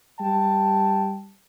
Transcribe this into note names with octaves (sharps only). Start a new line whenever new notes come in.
G3 G5 A5